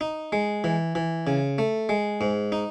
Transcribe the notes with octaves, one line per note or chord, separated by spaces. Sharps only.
D#4
G#3
E3
E3
C#3
A3
G#3
G#2
D#4